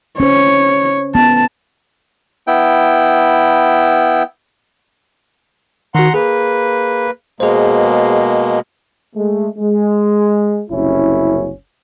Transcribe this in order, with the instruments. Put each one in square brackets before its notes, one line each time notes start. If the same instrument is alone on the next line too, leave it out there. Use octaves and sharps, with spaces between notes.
[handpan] C#4 C5 [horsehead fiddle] C#5
[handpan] B3 [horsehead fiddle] A5
[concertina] B3 E4 G5
[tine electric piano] D#3 F#4 [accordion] F#5 A#5 C6
[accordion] A#3 B4 [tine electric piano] G#4
[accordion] B2 G#3 A#3 [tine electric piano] G#4 C5
[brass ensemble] G#3 A3
G#3
F#1 C2 C#4 E4